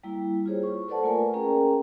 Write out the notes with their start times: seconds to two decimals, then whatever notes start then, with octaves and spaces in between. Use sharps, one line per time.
0.03 G3 A#3 E4
0.46 F4 G4 G#4 C5 C#5
0.63 C#6
0.88 A4 B4 C5 D5 F#5 A5
1.04 A3 A#3 F4 A#4 G#5
1.33 C#4 G#4 A#4 G5 A#5